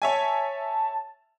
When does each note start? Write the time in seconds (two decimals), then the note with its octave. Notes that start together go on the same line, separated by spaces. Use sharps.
0.02 C#5 E5 G#5 A5